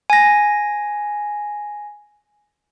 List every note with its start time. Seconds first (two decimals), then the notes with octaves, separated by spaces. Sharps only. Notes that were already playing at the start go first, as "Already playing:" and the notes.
0.10 G#5 A#6